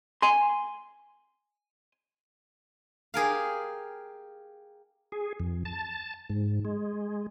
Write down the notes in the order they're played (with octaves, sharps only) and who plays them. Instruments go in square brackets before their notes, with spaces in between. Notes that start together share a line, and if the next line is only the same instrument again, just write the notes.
[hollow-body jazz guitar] G#5 C6
[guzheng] G4 G#4 A#4 F5
[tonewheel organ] G#4
F2
A5
G#2
G#3